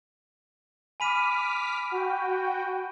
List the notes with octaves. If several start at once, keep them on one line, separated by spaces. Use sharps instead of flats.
G#5 B5 D6 F6 B6 D#7
F#4 G5